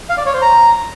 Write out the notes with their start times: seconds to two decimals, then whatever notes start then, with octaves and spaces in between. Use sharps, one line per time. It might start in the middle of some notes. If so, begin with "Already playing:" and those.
0.09 F5
0.18 D5
0.26 C#5
0.34 C5
0.42 A#5